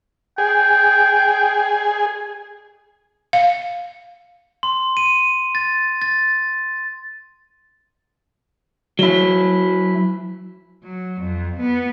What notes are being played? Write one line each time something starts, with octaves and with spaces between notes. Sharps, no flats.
G#4 G5
F5
C6
D#7
A6
A6
F#3 E4
F#3
F2
B3